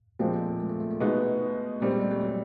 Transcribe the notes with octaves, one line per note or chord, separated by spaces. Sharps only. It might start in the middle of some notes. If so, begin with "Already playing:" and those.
A#2 F3 G#3 A#3 C4
A3
G#3
A3
A3
A3
B2 G#3 B3 D#4
A#2 G3 G#3 C4
G#3
A3
G3
F#3